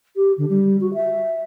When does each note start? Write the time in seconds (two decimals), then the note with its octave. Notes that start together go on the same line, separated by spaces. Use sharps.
0.16 G4
0.38 D3
0.49 G3
0.80 F#4
0.94 E5